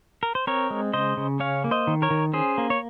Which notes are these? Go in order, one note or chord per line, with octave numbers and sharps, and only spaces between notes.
A#4
C5
C4 A#4 C#5
G#3
C#3 C5 D#5
C#3
C#4 C#5 F5
A#3
C5 D#5
D#3
A#4 C#5
D#3
C#4 G#4 C5
A#3
C#5